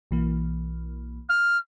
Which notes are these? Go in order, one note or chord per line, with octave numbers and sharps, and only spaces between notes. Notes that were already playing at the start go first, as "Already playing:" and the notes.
B1 E3 A#3
F6